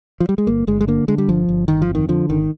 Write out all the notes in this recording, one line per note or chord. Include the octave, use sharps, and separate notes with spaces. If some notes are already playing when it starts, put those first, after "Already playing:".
F3
G3
G#3
G1 A#3
G1 G#3
G#3
D3 A#3
D3 G#3
G3
G1 F3
G1
G1 D#3
F3
F2
D#3
D3 F3
G#1 D#3